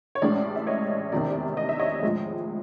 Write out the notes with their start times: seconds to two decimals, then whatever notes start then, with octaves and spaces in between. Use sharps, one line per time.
0.15 C#5
0.22 A1 A2 E3 G#3 C#4 D5
0.56 E5
0.67 C#5 D#5
1.12 F1 E2 C3 D#3 D5
1.57 D#5
1.69 E5
1.79 C#5 D#5
2.03 A2 F3 G#3